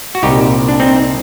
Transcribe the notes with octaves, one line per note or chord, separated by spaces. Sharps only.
F#4
C2 A#2 D#4 G4
D4
C4 D#4